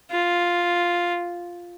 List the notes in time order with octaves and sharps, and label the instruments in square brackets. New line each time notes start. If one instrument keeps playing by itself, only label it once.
[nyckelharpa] F4